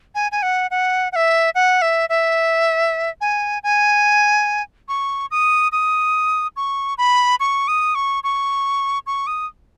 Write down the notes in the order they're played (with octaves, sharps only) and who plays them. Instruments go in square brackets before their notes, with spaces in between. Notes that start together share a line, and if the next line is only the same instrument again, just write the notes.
[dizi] G#5
G#5
F#5
F#5
F#5
E5
F#5
E5
E5
G#5
G#5
C#6
D#6
D#6
C#6
B5
C#6
D#6
C#6
C#6
C#6
D#6